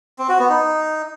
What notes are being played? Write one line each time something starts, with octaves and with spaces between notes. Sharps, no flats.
C4
F#4
B3
D#4